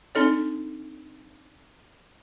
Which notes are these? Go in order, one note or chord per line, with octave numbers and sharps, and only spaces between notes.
C4 D4 D#4 A4 C#5